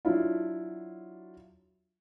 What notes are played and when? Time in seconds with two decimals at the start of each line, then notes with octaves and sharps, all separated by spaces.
0.05 F#3 D4 E4 F4